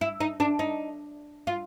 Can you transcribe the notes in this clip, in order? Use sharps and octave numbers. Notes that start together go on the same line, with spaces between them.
E4
D#4
D4
D#4
F4